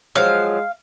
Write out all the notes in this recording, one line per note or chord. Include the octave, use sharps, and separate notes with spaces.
F3 F#3 G#3 F5